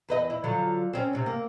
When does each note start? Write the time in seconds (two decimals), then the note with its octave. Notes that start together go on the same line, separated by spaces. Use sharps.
0.09 E2 B4 D#5
0.30 E4
0.44 D3 F3 F#3
0.93 C4 C#4
1.13 G#2 C3
1.26 A#3